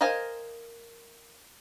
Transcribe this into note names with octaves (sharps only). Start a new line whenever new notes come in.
A#4 C5 D#5 F5 G#5